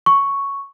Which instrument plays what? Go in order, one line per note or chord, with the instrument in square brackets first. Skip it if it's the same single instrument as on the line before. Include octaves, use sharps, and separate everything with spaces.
[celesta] C#6